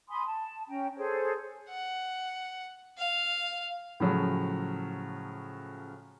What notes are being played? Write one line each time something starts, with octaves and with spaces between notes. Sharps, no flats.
G#5 B5 C6 D#6
A5
C#4 G5 A#5
G#4 A4 C5 C#5
F#5
F5
A2 C#3 F3 F#3